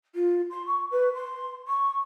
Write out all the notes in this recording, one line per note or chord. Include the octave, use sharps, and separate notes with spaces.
F4
C6
C#6
B4
C6
C#6